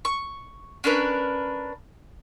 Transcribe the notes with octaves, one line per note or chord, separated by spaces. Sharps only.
C#6
C#4 D4 A#4 B4